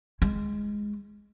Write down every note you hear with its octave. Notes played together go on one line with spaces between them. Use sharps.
G#3 E4